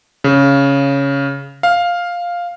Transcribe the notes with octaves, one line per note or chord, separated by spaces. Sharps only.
C#3
F5